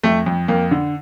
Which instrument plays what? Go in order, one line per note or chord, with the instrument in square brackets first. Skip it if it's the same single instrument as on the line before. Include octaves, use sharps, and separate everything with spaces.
[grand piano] F2 A3
F2
F2 A#3
D3